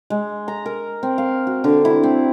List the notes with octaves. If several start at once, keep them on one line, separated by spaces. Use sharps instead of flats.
G#3
A#5
A#4
C4
F5
F#4
D3
E4
C4